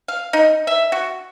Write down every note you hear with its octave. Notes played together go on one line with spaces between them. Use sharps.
F5
D#4
E5
F#4